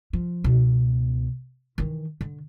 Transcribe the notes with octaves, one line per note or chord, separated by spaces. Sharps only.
F3
C#2 B2
D#3 E3
D3